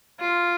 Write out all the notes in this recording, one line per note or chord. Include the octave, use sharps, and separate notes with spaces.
F4